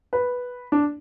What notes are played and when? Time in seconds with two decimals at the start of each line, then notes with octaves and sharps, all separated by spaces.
0.13 B4
0.72 D4